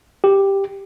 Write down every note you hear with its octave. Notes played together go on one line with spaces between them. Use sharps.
G4